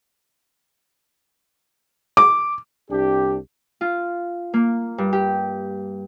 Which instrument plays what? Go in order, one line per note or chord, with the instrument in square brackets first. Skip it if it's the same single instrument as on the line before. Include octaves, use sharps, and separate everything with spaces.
[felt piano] D6
[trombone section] C2 D4 G4
[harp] F4
A#3
G2
G4